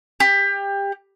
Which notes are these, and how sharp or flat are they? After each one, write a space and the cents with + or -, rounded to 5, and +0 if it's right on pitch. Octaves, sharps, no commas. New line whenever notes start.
G4 +25